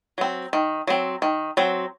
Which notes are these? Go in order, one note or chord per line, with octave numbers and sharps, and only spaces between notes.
F#3 C4
D#3
F#3 C4
D#3
F#3 C4